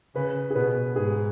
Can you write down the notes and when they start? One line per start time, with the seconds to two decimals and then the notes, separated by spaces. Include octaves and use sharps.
0.15 C#3 B4
0.50 G#4
0.55 B2 B4
0.96 G#2 G#4